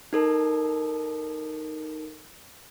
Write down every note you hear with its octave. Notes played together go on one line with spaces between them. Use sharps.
D#4 A4 A#4